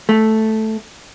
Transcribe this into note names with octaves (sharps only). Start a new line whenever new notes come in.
A3